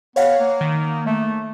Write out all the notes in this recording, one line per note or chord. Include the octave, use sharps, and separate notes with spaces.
B3 C#5 F5 F#5
A#3
D#3
A3